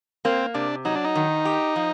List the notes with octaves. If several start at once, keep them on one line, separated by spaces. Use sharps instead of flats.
A#3 C4
C3 D4
F#3 D#4
D4
D#4
D#3
G4
F3